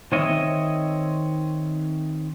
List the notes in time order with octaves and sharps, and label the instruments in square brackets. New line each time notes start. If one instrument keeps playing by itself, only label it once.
[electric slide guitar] D#3 C4 C#5 D#5 E5